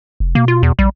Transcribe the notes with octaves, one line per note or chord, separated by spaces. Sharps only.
F1
B2 A#3
F4
E2
A#1 G3